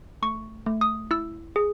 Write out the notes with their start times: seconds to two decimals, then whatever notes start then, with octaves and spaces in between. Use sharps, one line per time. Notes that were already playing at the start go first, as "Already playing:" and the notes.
0.22 A3 C#6
0.66 A3
0.81 D#6
1.11 E4 E6
1.56 G#4